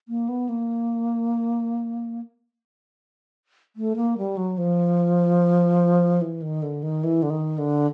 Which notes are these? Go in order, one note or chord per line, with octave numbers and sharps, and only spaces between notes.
A#3
B3
A#3
A3
A#3
G3
F#3
F3
E3
D#3
D3
D#3
E3
D3
D#3
D3